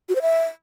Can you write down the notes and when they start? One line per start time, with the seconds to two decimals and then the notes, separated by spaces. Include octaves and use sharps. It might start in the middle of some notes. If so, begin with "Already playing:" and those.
0.09 F#4
0.15 C5
0.22 E5